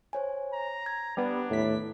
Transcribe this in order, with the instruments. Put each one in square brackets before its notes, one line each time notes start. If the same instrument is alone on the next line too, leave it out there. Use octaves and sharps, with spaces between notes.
[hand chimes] C5 C#5 G#5
[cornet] A#5
[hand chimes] G#6
[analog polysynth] G3 B3 [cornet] D4
[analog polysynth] D#2 B6 [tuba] A2